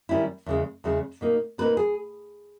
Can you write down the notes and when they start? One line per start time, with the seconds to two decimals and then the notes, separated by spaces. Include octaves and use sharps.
0.09 G#2 D#3 G3 C#4 E4
0.46 E2 C#3 G#3
0.84 E2 C#3 G#3
1.21 B2 A#3 D#4
1.58 B2 A#3 D#4 B4
1.77 G#4